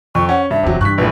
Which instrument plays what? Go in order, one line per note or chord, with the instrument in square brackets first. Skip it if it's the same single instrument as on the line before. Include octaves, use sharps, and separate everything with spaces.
[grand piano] F2 [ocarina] C#6
[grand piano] C#4 [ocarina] F#5
[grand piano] G2 [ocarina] E5
[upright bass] F1 E2 [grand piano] C3 F#3
[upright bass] G2 E3 [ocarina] C#6 [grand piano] F#6 B6
[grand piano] A#1 A2 [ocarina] B4